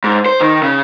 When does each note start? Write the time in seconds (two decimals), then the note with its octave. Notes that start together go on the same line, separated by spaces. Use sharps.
0.04 G#2
0.26 C5
0.41 D#3
0.63 C#3